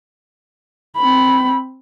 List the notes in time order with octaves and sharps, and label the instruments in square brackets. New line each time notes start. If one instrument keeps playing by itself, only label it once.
[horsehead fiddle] C4 B5